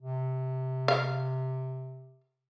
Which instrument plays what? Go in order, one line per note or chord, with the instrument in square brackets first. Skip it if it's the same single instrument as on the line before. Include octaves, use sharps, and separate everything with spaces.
[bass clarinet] C3
[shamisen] F5